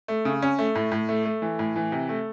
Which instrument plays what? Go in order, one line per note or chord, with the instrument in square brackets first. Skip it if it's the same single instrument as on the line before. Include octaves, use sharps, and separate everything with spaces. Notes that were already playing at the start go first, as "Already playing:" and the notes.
[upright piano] A3
C#3
C#4
A3
A2
A2
A3
A3
E3
A2
E3
C3
A3